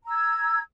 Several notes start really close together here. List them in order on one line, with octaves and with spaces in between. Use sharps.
A#5 E6 G#6